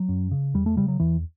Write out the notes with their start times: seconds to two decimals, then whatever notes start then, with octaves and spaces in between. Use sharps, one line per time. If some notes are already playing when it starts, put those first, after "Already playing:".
Already playing: F#3
0.09 F#2
0.31 C#3
0.54 E2 G3
0.66 A3
0.77 C#3 G3
0.88 F#3
1.00 E2 E3